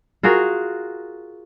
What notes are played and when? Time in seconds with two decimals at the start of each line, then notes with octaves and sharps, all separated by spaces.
0.23 F4 F#4 G#4 A#4